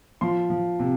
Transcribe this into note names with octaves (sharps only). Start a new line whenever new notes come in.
F3 C6
F3
C3